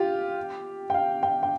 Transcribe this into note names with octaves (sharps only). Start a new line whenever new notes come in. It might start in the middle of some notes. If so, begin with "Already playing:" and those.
Already playing: F4 G4
G5
F5
G5
G5